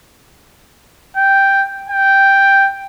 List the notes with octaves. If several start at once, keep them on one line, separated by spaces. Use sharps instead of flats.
G5
G5